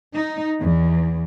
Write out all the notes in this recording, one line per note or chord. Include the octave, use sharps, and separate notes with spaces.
D#4
E2